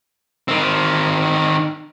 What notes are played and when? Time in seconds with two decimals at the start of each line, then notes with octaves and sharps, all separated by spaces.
0.48 D#3 C4